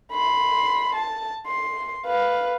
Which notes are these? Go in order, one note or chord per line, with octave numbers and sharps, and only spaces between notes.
B5 C6
A5
C6
B4 F5